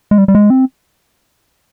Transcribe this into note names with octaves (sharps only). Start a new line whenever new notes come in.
G#3
G3
G3
G#3
C4